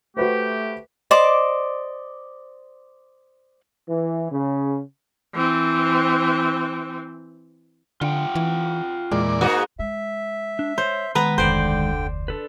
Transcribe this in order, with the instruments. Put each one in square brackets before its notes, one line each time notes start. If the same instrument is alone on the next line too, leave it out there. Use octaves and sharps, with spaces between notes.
[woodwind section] A3 G4 [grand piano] F#4 B4 C5
[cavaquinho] C5 D5 D#5 D6
[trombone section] E3
C#3
[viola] E3 C4
[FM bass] D3 [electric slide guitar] F4 F#5 G5
[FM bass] E3
[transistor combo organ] E2 A#2 D5 [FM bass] G#3
[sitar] G#2 A#3 F#4
[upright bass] G#3 [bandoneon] E5
[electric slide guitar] D4
[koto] C5 [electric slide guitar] C#5
[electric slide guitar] D#3 G#3 [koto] B3 B4 A#5
[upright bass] F1 D2 [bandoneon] D3 G5 [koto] C5 D5
[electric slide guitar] D4 A4 B4